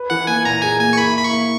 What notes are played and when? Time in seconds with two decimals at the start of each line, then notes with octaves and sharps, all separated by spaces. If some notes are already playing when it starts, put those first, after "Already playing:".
Already playing: B4
0.10 E3 F#5
0.27 A#3 G#5
0.45 A#2 A#5
0.62 G#4 G#5
0.80 A#3 G#5
0.93 C#6
0.98 E4 B5
1.16 E4 B5
1.24 C#6
1.32 A#3